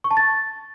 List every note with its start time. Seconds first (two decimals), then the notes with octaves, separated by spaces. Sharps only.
0.04 C#6
0.11 A5
0.17 A6